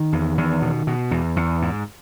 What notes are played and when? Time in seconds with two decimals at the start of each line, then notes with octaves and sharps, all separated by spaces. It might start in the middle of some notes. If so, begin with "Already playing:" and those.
Already playing: D#3
0.12 E2
0.38 E2
0.62 B2
0.87 B2
1.11 E2
1.36 E2
1.62 G#2